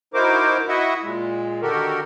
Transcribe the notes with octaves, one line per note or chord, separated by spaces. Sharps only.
D#4 E4 F#4 A#4 C5 D6
E4 F#4 D#5 E5 F#5
A#2 G#3
D3 D#3 F#4 G4 A4 A#4